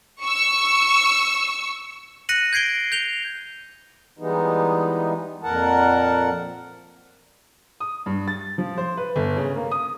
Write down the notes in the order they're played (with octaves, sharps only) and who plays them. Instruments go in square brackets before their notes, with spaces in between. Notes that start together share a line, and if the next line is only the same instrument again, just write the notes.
[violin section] C#6 E6
[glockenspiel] F#6 A#6 C#7 D#7 F#7
G6 G#6 C7 D7 G7
G6 F7 G7
[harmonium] E3 G3 G#3 B3 D#4
F2 A#2 A#4 F#5 A5
[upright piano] D#6
G2
A6
F3
C5
B4
G1
C#3
A#3
D#6